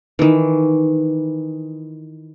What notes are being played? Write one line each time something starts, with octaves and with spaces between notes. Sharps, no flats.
D#3 E3